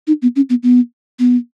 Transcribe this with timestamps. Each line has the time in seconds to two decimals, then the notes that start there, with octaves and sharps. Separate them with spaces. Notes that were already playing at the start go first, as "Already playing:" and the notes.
0.07 D#4
0.22 B3
0.36 C#4
0.50 B3
0.63 B3
1.19 B3